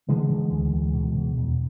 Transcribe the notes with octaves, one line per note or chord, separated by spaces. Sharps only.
D3 E3 G#3
D3
D2
D2
B2
B2
E2